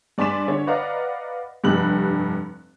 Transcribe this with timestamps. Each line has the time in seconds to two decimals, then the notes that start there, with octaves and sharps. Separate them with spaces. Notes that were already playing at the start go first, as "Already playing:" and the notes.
0.18 G2 D5 G#5 C6 B6 E7
0.48 D3 C#5
0.67 B4 D5 D#5 F5 F#5 A#5
1.64 F1 G2 G4 B5 F#6 F#7